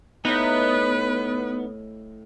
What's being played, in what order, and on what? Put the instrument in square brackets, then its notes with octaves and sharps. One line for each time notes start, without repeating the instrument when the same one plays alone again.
[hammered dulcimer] A2 D#5 [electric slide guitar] B3 [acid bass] D#4 [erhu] B4